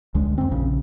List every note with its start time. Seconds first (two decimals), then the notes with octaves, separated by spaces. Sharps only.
0.15 C#2 D3 G#3
0.38 F2 C4
0.52 A#1 C#3